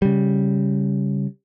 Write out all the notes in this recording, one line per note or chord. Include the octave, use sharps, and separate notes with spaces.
C#3 G3